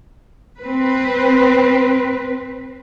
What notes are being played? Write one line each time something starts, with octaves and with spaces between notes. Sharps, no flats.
C4 B4